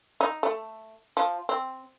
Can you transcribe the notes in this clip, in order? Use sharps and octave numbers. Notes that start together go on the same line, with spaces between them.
D#4
A3
F3
C4